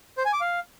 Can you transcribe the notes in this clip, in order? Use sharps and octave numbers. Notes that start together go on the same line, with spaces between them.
C5
G#5
D6
F5